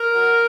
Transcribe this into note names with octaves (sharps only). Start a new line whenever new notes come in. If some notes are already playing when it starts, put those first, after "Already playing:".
Already playing: A#4
F#3